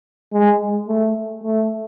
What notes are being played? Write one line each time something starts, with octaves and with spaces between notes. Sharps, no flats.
G#3
A3
A3